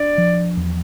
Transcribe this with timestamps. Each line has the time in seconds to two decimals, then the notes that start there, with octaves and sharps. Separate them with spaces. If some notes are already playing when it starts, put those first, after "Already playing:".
Already playing: D4 D5
0.18 F3
0.57 E2